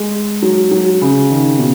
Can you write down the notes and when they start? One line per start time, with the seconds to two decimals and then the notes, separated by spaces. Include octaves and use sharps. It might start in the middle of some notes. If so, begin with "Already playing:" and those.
Already playing: G#3
0.42 F#3
0.71 F#3
1.01 C#3
1.30 D#3
1.59 B2